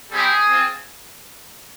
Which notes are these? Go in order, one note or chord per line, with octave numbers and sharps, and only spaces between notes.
G3 C4 E4 G4 G#4
C4 F4